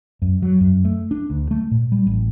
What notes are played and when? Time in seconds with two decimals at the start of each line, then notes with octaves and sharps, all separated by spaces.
0.22 F#2
0.42 F#3
0.61 F#2
0.85 A3
1.11 D4
1.30 D2
1.51 A3
1.71 A#2
1.92 G3
2.07 A1